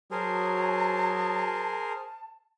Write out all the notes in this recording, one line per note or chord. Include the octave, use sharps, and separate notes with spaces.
F#3 G#4 A#4 C5 A5